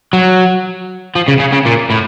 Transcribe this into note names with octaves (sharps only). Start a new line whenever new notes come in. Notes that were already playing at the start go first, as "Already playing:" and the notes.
F#3
F3
C#3
C#3
C#3
A#2
A2